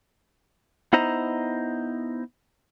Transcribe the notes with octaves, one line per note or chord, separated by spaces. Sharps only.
B3 D#4 E4 C5 D#5 A#5